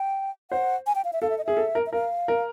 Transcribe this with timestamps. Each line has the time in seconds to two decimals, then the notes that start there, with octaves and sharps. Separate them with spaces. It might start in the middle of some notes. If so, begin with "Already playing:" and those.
Already playing: G5
0.51 C5 F#5
0.87 G#5
0.95 G5
1.05 F5
1.13 E5
1.22 A4 F5
1.30 E5
1.38 D#5
1.45 G#4 E5
1.57 A4
1.75 A#4
1.86 E5
1.93 A#4 F5
2.28 A#4